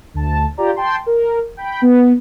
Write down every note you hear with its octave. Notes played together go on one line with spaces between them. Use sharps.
D2 A5
F4 G4 D5 A#5
G5 A5 C6
A#4
G5 B5
B3